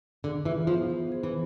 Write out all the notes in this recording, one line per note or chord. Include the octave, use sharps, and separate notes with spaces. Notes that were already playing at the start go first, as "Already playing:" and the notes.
D3 G#4
E3 F4
F3 B3
C5
G#4
E3